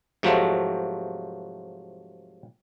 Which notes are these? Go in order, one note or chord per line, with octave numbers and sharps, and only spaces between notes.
G#2 C3 F3 F#3 A3